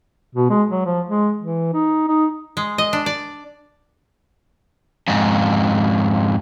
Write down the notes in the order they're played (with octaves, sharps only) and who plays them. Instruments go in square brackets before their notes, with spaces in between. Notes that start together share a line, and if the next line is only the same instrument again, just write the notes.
[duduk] B2
G#3
F#3
F3
G#3
E3
D#4
D#4
[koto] G#3
D#5
D4
D5
[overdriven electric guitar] F2 G#2